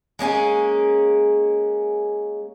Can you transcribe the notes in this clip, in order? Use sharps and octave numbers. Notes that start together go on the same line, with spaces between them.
G#3 A#3 C#4 G#4